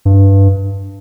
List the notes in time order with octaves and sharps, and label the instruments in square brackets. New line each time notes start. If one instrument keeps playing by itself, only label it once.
[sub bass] G2